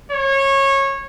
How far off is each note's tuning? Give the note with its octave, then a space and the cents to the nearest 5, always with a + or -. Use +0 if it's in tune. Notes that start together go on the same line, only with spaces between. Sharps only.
C#5 -20